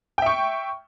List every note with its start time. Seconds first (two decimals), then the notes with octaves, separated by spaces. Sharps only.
0.18 G5
0.22 E5
0.26 C#6